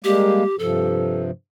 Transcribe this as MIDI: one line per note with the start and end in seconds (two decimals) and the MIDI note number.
0.04 0.44 55
0.04 0.44 56
0.04 0.44 58
0.04 0.56 67
0.59 1.31 43
0.59 1.31 48
0.59 1.31 53
0.59 1.22 69